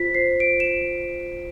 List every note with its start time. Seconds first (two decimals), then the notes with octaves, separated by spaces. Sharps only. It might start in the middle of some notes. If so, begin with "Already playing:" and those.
Already playing: F4 C5 B6
0.14 C5 C7
0.40 C5 D7
0.60 E7